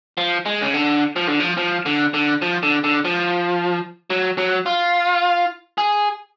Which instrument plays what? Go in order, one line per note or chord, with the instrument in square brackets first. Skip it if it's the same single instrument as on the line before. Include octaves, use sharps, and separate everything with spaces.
[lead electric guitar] F3
G#3
C#3
D3
F3
D3
F3
F3
D3
D3
F3
D3
D3
F3
F#3
F#3
F4
G#4